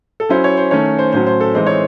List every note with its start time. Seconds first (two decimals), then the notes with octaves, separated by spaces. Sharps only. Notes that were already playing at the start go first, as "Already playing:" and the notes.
0.20 A4
0.29 F#3 C#4 E4 C5
0.44 C#5
0.57 C5
0.71 D#3 A3 C#4 C#5
0.99 C5
1.12 A2 F#3 C#4 C5
1.27 C5
1.41 A4
1.54 E3 G#3 C4 D#4 C5
1.67 C#5